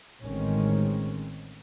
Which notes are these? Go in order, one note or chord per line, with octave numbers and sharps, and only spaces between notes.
A1 D#3 G#3 C4 C#4